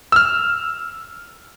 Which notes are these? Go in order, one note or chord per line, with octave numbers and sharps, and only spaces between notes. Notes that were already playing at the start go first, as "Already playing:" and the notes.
E6 F6